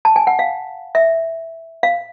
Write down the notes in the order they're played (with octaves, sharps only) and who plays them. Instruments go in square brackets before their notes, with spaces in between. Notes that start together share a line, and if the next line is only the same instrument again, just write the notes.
[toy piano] A5
G#5
F#5
F5
E5
F5